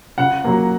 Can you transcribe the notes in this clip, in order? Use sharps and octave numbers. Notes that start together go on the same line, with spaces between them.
C#3 F#5
F#3 A#3